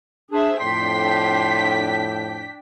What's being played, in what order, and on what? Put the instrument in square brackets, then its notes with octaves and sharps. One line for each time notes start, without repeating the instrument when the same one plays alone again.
[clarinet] D4 [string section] G#4 C5 E5
[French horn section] F2 A2 [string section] D4 G5 B6 [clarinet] C6